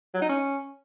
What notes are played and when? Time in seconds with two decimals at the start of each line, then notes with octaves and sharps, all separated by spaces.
0.14 F#3
0.21 D#4
0.29 C#4